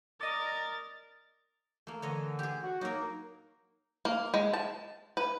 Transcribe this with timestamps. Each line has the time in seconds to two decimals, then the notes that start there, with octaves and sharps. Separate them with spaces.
0.21 A#4 D5 D#5 A6
1.87 A3 A#3
2.02 D3 E3 C#5 D#5
2.39 G4 G#4
2.62 F#4
2.81 F#3 A#3 D#4 A#4
4.05 A#3
4.34 G#3
4.53 A5
5.17 B4